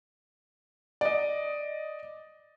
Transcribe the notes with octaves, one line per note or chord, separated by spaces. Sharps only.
D5 D#5